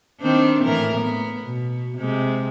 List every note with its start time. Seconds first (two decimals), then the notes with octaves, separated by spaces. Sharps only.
0.21 D#3 C4 D4
0.64 A2 E3 A#4
1.00 B3
1.43 B2
1.97 C3 G#3